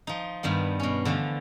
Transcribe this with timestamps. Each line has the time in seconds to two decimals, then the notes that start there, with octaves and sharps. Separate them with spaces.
0.07 F3 D#4
0.43 G2 D#3 G3 B3
0.80 B2 C#4
1.05 D3 E3 F3 A3